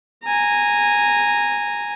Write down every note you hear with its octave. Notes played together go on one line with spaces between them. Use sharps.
G#5 A#5